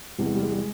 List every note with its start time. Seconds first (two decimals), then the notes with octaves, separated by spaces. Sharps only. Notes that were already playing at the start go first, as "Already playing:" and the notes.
0.18 E2 C3 E3 G3
0.26 G#3
0.35 G3
0.42 G#3
0.51 G3
0.58 G#3